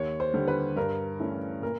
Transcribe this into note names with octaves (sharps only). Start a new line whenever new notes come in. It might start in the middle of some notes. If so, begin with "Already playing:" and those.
Already playing: D#2 C#5
C5
D3 G3
B4
G2 A#4
E3 A3 C#4
A#2 A#4